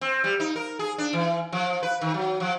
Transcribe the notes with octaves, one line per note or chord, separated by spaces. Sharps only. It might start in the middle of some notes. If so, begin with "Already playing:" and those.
C4
G3
D#4
A#4
G#4
D4
E3
F3
B4
D#3
F#3
F3